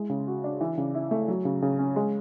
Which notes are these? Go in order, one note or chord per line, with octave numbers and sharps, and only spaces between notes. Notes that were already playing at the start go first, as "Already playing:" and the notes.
Already playing: G#3 E4
C#3
F#4
D4
E3
C#3
E4
A3
F#3
C#3
C#3
C#4
G#3